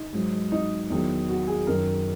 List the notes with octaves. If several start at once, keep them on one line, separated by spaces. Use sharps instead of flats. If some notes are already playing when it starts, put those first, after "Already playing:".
Already playing: D#4
G#2 F#3
D#4
E2 D#3 F#3
F#4
G#4
F#2 D#3 F#3 A#4